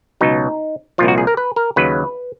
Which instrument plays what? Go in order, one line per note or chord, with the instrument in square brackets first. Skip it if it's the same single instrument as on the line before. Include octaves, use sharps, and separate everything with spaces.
[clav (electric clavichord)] C#2 B2 F#3 D#4
C2 A#2 F3 F4
F#4
G#4
A#4
B4
A#4
D#2 C#3 F#3 B4